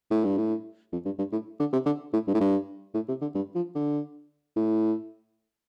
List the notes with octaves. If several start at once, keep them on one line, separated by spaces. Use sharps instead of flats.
A2
G2
A2
F2
G2
G2
A2
D3
C3
D3
A2
G2
A2
G2
A2
C3
D3
G2
F3
D3
A2